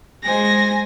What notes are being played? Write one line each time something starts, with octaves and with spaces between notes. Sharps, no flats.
G#3 C5 G#5 A#6